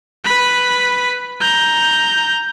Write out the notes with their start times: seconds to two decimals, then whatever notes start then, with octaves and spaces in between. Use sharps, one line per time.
0.24 B4 B5
1.40 A#5 G6